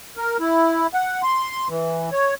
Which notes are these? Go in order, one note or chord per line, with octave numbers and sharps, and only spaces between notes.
A#4
E4
F#5
C6
E3
C#5